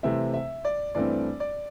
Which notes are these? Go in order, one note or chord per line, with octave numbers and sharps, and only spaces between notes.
C3 E3 A3 C4 E5
E5
D5
G2 E3 A3 C4 D5
D5